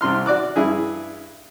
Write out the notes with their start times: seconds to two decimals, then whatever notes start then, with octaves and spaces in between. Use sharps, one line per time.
0.01 C2 C3 C6 F6
0.26 F#4 D5 D6 F#6
0.56 G2 E4 G#4